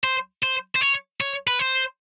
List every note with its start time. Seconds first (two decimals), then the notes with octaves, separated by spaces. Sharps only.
0.04 C5
0.43 C5
0.75 C5
0.81 C#5
1.20 C#5
1.47 B4
1.60 C5